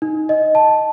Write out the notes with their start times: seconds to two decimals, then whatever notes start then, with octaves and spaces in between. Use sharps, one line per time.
0.02 D#4
0.29 D#5
0.55 A5